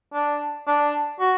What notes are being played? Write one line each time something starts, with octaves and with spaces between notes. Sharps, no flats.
D4
D4
F#4